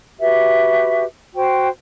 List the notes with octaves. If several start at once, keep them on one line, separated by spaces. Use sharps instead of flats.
F#4 G4 B4 E5
F#4 C5 G5